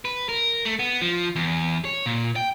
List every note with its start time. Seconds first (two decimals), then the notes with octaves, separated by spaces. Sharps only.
0.05 B4
0.29 A#4
0.65 A3
0.79 B3
1.01 F3
1.36 E2
1.85 C#5
2.06 A#2
2.36 G5